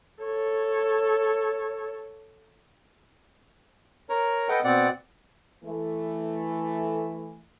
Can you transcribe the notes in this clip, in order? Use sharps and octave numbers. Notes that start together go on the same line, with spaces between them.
A4 C#5
A#4 C#5 A#5
A4 B4 D#5 F#5 G5
B2 C4 D5 F#5
E3 A3